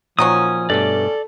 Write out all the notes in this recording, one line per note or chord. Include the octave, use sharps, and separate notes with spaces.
A#2 D#3 F3 F#3 C#4 A#5 D#6
G2 B2 A3 A4 D5